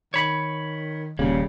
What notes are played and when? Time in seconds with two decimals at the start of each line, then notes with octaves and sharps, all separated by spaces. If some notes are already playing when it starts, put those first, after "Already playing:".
0.14 D#3 C#5 B5
1.19 D#1 C#3 G3 A#3